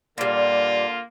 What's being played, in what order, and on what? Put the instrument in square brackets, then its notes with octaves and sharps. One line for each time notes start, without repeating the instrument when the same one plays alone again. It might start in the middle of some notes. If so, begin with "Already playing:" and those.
[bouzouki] A#2 G3 [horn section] D3 A#3 F4